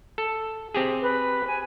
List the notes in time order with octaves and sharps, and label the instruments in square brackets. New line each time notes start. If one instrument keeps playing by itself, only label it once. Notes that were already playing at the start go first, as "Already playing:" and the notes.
[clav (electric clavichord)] A4
C4 G4 G#4
[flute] B4
G#5